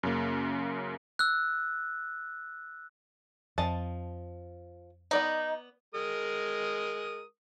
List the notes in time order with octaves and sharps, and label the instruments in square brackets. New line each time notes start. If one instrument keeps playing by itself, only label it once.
[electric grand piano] F#2 C#3 A#3
[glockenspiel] E6 F#6
[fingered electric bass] F2 [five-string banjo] F3 D#5 A5
[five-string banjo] B3 D5 B5 [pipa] D#4
[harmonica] G#3 A#4 D#6